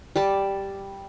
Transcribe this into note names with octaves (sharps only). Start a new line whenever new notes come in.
G3 D5 A5